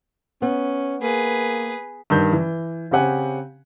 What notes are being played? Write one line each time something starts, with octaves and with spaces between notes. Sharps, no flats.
B3 C#4
A#3 G#4 B4
G2 D#3 G6
E3
C#3 C4 G4 F#5 G#5